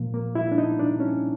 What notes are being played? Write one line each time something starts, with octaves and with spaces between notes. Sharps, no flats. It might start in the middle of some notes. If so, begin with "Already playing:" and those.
Already playing: A#2 F3 A#3
A#3
E4
D4
D#4
D4
C#4